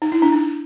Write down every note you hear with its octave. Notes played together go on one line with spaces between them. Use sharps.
D#4
E4
D4
D#4